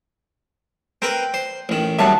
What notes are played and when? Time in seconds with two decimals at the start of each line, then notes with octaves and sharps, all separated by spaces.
1.02 C4 A#4 B4 G5
1.34 C5
1.69 A1 D#3
1.99 D#2 C#3 F#3 G3 E5 F#5 A5 C#6